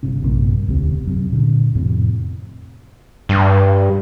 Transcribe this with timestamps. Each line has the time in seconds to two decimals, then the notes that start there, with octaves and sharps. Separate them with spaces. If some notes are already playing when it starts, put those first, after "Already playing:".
0.03 G1 C3 C#4
0.24 A#1 G2 C3 A#3
0.67 E1 D2 C3
1.07 F#2 C3
1.32 A#2 D3 D4
1.75 F2 A2 C3
3.29 G2